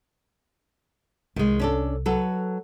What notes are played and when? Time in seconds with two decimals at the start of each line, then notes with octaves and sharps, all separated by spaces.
1.36 C2 D#3 G#3
1.59 C#4 D4 A4
2.06 F#3 A4 B4